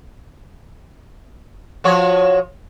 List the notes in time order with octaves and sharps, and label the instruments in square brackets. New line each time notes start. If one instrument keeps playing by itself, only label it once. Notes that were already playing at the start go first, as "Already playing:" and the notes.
[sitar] F3 F#4 C#5